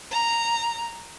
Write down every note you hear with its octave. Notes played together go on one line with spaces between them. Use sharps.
A#5